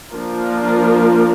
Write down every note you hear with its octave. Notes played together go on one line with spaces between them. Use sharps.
F3 A#3 D4 F4 A#4